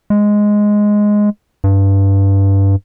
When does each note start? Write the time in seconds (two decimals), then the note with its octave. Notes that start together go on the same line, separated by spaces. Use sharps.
0.10 G#3
1.64 G2